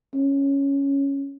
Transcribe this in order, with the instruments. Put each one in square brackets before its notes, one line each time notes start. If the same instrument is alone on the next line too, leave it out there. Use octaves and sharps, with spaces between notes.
[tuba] C#4